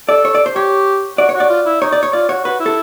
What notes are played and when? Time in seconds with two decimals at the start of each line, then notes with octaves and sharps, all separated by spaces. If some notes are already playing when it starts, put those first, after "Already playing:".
0.09 A4 D5
0.25 C#5
0.35 D5
0.46 C5
0.56 G4 C#5
1.18 F#4 D5
1.29 C#5
1.35 F#4
1.40 D5
1.50 F4
1.66 E4
1.81 D#4 C#5
1.92 D5
2.03 C#5
2.13 F4 D5
2.29 F#4 C#5
2.45 F#4 B4
2.60 E4
2.66 A4